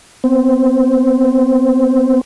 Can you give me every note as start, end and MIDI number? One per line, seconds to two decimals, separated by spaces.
0.24 2.21 59
0.24 2.21 60
0.24 2.21 72